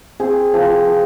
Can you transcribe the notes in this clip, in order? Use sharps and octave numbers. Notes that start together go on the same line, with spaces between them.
C4 G#4
F3
F3